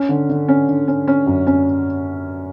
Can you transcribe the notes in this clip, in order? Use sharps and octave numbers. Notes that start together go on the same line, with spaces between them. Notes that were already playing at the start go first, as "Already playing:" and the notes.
Already playing: C#4
D3
D3
C#4
D3
C#4
C#4
F#2
C#4